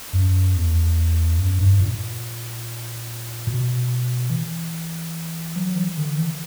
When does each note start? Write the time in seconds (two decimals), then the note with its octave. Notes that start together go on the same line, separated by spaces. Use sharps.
0.13 F#2
0.56 E2
1.38 F#2
1.59 G2
1.81 A#2
3.47 B2
4.30 E3
5.56 F#3
5.76 E3
5.97 D3
6.18 E3